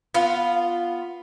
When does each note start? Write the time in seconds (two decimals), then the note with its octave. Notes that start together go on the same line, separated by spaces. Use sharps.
0.14 B3 F4